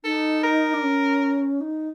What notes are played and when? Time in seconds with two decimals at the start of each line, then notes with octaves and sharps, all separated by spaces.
0.04 D#4 A4
0.43 A#4
0.74 D4
0.83 C#4
1.61 D#4